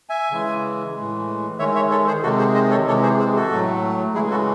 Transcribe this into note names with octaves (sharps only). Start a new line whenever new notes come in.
E5 G#5
C#3 E3 G#3
A2 E3 G#3
D#3 G#3 C#5 E5
C#5 E5
A4 C#5
G#4 C5
C3 D#3 G#3 F#4 A4
G#4 C5
C5 D#5
A4 C#5
C3 E3 G#3 A4 C#5
G#4 C5
G#4 C5
F#4 A4
A2 F#3 A3
C#3 E3 G#3 E4 G#4
F#4 A4